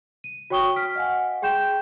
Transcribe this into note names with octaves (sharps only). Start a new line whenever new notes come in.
D#7
F#4 C#5 G5 C#6 D#6 G7
F6 B6 D7
D#5 F5 F#5 G#5
G#4 G5 C6 G6 E7